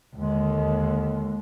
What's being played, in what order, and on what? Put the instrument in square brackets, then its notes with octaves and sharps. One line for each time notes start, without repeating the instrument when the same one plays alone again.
[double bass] D#2 [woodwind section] D3 G#3